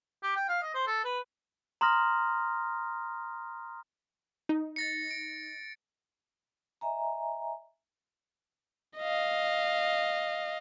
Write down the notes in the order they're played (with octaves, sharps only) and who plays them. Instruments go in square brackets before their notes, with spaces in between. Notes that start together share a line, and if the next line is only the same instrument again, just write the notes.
[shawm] G4
G5
F5
D#5
C5
A4
B4
[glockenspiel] A#5 C6 D#6 F6 A#6
[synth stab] D#4
[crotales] A6 A#6 C#7
D7
[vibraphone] D#5 E5 G#5 A#5
[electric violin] D#5 F5